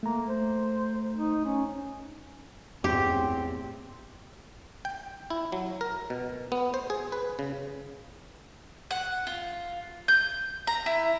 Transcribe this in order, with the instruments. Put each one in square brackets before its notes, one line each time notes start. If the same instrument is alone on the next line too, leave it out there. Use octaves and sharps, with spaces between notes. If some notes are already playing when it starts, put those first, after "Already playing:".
[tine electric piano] A3 A#5 [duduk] A#3
[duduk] C5
D#4
C#4
[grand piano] A1 E2 [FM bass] G2 [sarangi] C4 [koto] G4
[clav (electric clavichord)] G5
E4
F#3
A#4
B2
B3
C5
G#4
B4
C#3
[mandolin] F#5
F4
G6
A#5
E4